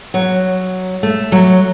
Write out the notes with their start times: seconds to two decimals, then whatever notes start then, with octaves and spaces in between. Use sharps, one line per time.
0.14 F#3
1.03 A3
1.32 F#3